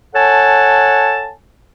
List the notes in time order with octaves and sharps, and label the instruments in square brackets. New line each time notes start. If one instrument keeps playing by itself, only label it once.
[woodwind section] A4 C#5 F#5 G#5 A5